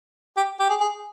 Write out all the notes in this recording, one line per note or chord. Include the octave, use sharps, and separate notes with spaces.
G4
G4
G#4
G#4